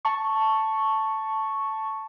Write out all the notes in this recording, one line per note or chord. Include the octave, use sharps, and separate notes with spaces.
A5 C#6